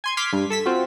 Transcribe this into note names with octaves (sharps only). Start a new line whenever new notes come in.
G#5 C6 G#6
C6 D6 F6 G#6 B6
G2
A4 E6 B6
C4 F4 F#4